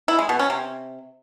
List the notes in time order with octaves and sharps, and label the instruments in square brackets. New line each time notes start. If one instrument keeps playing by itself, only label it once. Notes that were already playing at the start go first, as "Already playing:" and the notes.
[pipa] E4
G#3
B2
C#4
C3